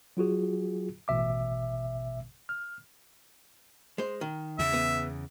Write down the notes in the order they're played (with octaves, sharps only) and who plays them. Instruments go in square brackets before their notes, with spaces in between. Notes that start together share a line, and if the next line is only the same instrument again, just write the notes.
[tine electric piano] F#3 F4 F#4 G#4
A1 B2 E5 D6
F6
[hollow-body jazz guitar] G#3 C5
D#3
[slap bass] E2 C#3 [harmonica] E5
[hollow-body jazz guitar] B3